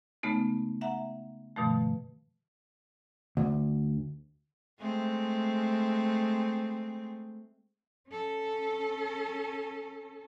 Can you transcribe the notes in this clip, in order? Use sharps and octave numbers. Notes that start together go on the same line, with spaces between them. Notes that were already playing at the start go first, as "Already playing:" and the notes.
C#3 G#3 A3 B3 D#4
E5 F#5 A#5
G2 B2 D#3 F3 A3
D2
G#3 A3 C4
C#4 A4